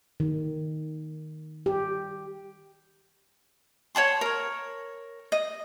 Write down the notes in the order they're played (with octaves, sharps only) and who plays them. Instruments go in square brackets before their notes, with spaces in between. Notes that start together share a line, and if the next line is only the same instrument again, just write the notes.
[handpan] D#3
G4
[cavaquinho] C#5 F#5 A5 C6
A#4 C#5
D#5